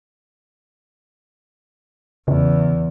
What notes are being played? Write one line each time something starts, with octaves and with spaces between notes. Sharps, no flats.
E2 C#3